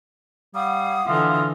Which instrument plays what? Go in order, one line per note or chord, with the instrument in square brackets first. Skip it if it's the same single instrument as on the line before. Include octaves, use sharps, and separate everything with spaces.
[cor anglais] G3 [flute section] F5 F#5 [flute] D#6
[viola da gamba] D3 E3 [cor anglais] F4